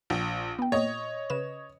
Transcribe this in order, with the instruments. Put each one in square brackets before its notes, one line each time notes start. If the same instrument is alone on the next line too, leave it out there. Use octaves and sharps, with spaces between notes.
[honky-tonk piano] A#1
[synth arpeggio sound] B3 G5
[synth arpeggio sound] A#2 [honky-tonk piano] C#5 D#5
[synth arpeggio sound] C#3 B4 E7